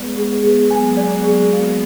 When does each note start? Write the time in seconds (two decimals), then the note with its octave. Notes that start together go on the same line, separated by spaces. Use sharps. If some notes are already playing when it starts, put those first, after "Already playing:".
Already playing: G#3 B3 D5
0.16 G#4
0.43 G#4
0.69 F#3 A#3 G#5
0.97 D5
1.24 G#4
1.52 F5